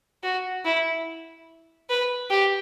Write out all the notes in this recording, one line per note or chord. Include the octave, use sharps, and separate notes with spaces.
F#4
E4
B4
G4